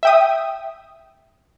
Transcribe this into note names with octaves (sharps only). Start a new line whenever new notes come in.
E5 G5 D#6